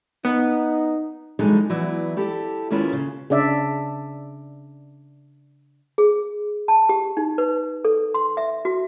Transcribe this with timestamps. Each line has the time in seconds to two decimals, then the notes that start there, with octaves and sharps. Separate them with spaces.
0.25 B3 D#4
1.39 G2 E3 F#3 G#3 D#4 A4
1.70 E3 F#3 B3 E4 D5
2.17 E4 G4 A4
2.70 D#2 D#3 C#4 E4 F4 B4
2.93 C#3
3.30 C#3 D4 D5 E5
5.98 G#4
6.68 A5
6.89 G4
7.17 D#4
7.38 B4
7.85 A4
8.14 C6
8.37 E5
8.65 F#4